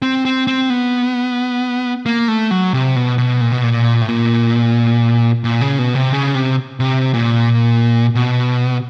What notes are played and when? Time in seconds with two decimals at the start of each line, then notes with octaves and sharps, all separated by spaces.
0.02 C4
0.25 C4
0.47 C4
0.70 B3
2.06 A#3
2.28 A3
2.51 F#3
2.73 C3
2.96 B2
3.18 B2
3.41 A#2
3.52 B2
3.64 A#2
4.01 A2
4.08 A#2
5.44 A#2
5.61 C#3
5.79 B2
5.95 C3
6.12 C#3
6.35 C3
6.80 C3
7.14 A#2
8.15 B2